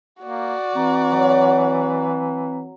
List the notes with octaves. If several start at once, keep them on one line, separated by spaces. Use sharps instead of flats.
A#3 F#4 D5
E3 C4 A#5
F#3